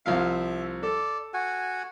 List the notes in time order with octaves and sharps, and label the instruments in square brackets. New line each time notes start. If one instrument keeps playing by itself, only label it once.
[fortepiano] C2 F3 F5 [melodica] E5
[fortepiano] A4 [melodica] D5
[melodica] F#4 F#5 G#5